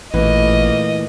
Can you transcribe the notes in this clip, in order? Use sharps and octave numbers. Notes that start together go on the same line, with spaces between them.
A1 A#2 E3 A3 A#3 D#5